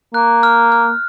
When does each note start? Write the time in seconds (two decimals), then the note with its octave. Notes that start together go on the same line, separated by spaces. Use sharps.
0.14 A#3 F#6
0.43 F6
0.72 F6